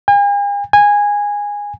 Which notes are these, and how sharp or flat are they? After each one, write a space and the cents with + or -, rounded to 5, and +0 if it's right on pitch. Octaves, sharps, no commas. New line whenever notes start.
G#5 -45
G#5 -15